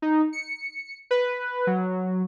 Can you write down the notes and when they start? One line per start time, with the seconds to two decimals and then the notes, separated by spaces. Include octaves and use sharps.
0.02 D#4
0.33 C#7
1.11 B4
1.67 F#3